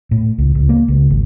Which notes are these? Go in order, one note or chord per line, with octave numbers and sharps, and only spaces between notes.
A2
C#2
C#2
A#3
C#2
G#1